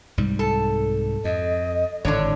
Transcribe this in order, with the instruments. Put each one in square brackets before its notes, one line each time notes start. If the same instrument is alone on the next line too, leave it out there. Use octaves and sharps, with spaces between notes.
[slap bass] C2 G#2 G3
[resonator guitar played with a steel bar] A4
[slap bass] F2 [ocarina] D#5
[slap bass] G#1 A2 [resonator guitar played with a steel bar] D3 D4 C#5